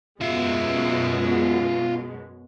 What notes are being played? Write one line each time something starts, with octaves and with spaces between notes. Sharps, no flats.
F#2 B2 G#3 F4 E5